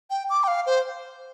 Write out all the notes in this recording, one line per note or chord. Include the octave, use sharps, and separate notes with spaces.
G5
D6
G5
F5
C5